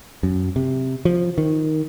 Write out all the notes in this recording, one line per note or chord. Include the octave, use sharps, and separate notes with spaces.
F#2
C3
F3
D#3